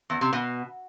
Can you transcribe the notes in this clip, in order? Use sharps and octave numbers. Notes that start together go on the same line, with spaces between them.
E2
C3
B2